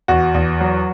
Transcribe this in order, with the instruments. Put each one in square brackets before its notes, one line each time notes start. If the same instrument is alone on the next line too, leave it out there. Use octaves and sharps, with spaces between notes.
[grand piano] E2 F#4
E2
F#3